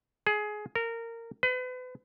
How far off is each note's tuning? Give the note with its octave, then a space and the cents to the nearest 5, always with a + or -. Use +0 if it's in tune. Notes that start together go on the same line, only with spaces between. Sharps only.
G#4 +20
A#4 -20
B4 +35